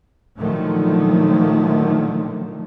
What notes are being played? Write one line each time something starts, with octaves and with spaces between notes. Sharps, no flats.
A#2 D3 D#3 F3 F#3 A3